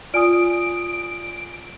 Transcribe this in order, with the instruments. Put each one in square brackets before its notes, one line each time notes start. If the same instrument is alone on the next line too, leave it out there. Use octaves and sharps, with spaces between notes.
[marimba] F4 [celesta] D5 G#5 D#6 [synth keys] D7